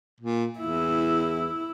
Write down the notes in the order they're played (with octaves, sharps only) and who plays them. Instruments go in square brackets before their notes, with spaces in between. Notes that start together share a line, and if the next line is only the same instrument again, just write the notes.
[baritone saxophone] A#2
[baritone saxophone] E2 [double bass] E4